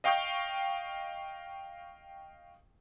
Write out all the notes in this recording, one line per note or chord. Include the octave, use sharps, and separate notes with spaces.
D#5 F5 G5 C#6 D#6 G6